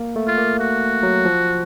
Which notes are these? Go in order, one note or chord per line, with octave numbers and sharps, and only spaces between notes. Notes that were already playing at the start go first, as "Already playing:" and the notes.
Already playing: A#3
A3
F4
A#3
F#4
F#3
F3